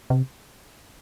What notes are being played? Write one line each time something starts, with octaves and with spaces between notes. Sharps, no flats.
C3